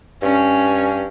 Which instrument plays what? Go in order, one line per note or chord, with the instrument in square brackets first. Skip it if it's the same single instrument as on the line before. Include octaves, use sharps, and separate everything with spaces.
[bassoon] G2 [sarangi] C#4